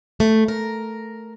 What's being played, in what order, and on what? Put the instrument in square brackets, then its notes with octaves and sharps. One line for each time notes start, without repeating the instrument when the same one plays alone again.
[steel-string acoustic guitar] A3
A#4